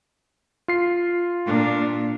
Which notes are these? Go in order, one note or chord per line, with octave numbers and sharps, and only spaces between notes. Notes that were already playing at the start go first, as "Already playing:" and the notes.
F4 C7
A#2 D4